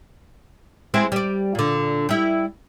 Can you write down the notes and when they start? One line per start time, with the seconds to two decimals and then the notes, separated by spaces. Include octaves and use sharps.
0.94 G#3 C4 E4
1.12 G3 D5
1.55 A#2 D3
2.09 G3 E4